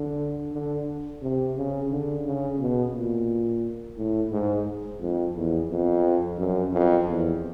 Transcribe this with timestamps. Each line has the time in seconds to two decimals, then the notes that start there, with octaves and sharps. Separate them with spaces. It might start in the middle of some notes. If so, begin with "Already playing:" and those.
Already playing: D3
0.53 D3
1.22 C3
1.56 C#3
1.91 D3
2.25 C#3
2.59 B2
2.94 A#2
3.98 A2
4.32 G#2
5.01 F2
5.35 E2
5.70 F2
6.38 F#2
6.73 F2
7.07 E2